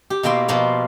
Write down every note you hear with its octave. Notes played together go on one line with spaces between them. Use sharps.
G4
B2 A#3 E4 G5 C6
B2 F3 A#3 F4